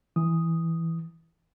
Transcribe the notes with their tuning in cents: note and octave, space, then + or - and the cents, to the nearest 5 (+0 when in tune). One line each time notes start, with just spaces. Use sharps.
E3 +0 D#6 +0